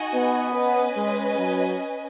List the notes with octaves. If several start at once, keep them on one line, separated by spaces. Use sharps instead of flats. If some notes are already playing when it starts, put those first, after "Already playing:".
Already playing: D#4 F#4 D#5 G#5
B3
C#4 B4 D#5 G#5
G#3
F#3